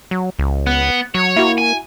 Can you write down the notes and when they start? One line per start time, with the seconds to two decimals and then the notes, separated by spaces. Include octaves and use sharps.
0.11 F#3
0.39 C#2
0.67 B3 F#5
1.15 F#3 C#5
1.37 A#3 E4 F#4
1.58 G#5